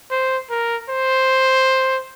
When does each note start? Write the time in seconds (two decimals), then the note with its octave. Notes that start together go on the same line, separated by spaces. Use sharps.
0.11 C5
0.50 A#4
0.89 C5